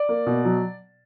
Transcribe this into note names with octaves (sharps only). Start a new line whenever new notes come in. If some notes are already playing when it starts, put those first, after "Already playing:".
Already playing: D5
A#3
B2
F#3